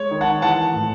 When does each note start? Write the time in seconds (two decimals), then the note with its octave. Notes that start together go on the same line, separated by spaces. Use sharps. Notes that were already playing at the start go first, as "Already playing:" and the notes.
Already playing: G#3 C#5
0.11 D#3
0.21 F#5 A5
0.42 E3 F#5 A5
0.74 A2